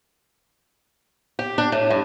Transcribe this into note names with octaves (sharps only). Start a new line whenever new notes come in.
G4
D4
A2
G2